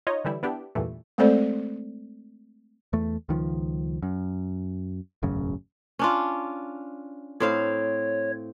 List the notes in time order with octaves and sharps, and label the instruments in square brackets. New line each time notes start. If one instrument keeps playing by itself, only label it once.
[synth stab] D#4 F4 C#5 D#5
D3 E3 G3 E4
B3 D4 E4 G4
E2 G2 A#2 E3 A3
[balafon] G#3 A3 C4 A4 C5 D5
[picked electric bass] E2 A3
C#2 D#3 F3
F#2
E1 A1 F#2 C#3
[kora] C#4 D4 F4
[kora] A2 C4 F5 [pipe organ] C#5